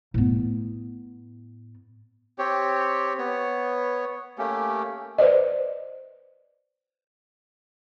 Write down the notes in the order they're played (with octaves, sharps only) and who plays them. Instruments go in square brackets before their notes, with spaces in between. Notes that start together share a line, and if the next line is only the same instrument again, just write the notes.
[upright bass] A2 B3
[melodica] C4 G4 C#5
B3 C#5
A3 A#3 C#4 G4
[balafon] B4 C5 D5 D#5